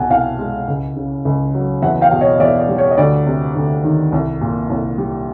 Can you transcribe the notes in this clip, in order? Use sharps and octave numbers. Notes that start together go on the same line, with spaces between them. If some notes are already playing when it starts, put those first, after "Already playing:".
Already playing: C2 B2 F#5 G#5 A5
C2 F5 G5
G#3
C#2
C#3
C#2
F#3
E2 E5 F#5
F5 G5
B2
C#5 D#5
D#5
E2 D5 E5
D5
G3
C#5
D#5
D2 D5
C3
D2
D#3
C2
A#2
C2
G3